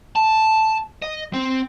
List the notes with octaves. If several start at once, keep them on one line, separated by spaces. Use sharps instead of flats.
A5
D#5
C4